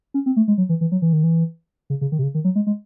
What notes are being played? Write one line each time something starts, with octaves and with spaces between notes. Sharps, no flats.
C#4
C4
A3
G#3
F#3
E3
E3
F#3
E3
D#3
E3
C#3
C#3
D#3
C3
C#3
D#3
F#3
G#3
G#3